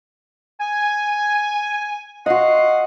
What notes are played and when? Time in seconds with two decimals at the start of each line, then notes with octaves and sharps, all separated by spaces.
0.60 G#5
2.26 F#4 D#5 F5 F#5 C6